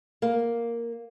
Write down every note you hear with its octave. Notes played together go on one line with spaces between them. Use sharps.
A#3